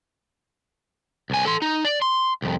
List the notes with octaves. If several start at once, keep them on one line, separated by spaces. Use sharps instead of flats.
C2 G#5
A4 C6
D#4
D5
C6
C2 F2